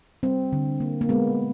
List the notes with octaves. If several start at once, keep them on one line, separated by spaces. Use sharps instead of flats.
G3 C4
D3
A#3
A#3
G#3 B3